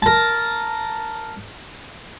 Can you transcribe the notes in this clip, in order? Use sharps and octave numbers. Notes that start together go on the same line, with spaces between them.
A#4 A5